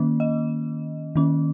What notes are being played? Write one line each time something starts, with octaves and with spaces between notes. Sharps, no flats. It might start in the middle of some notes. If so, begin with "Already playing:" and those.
Already playing: D#3 A#3 C#4
D#5
D#3 A#3 C#4